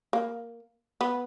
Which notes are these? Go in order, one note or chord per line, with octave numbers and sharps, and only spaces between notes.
A#3
B3